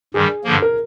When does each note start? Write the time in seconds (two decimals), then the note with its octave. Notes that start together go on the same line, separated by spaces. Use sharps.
0.14 G2 D#3 G3 G#4
0.44 G2 D3 F3 A#3
0.62 A#4